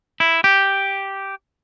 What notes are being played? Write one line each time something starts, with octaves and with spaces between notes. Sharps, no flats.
E4
G4